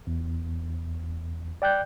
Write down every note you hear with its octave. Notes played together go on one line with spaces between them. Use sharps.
E2
D5 G5 F#6 G6